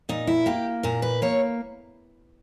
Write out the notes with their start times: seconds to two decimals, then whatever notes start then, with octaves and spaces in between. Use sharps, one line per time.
0.09 A#2 D#4
0.27 E4
0.46 A#3 G4
0.83 A#2 A#4
1.02 B4
1.22 A#3 C#5